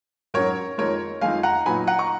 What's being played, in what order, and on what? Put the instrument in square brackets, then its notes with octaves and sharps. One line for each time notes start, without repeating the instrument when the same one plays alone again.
[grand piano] G#2 F#3 C#4 A#4 C#5
F2 D#3 G#3 A#4 C#5
F2 D#3 G#3 F5 G#5
F#5 A#5
A#2 F#3 B3 D#4 G#5 B5
F#5 A#5
A#5 C#6